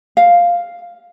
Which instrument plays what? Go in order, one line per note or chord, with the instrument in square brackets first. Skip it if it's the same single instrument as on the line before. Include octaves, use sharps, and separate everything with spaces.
[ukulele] F5